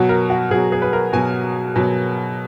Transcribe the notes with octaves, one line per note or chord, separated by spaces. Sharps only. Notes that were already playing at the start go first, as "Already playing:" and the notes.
Already playing: B2 F#3 F#4
A#4
F#4
B2 F#3 G#4
G#4
B4
A#4
B2 F#3 G#5
B2 F#3